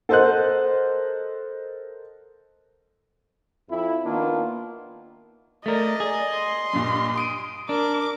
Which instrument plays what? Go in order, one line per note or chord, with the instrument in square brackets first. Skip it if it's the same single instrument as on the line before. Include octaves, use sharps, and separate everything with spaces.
[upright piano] A4 A#4 C5 D#5 F#5 F#6
[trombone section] F2 E4
D#3 A#3 B3 D4 F4
[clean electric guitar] A3 A#4 [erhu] D5 [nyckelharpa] D#5
[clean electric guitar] G#4
[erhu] C6
[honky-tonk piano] G2 A#2
D#6 D7 D#7
[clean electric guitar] D4 [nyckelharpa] A#4 [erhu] D6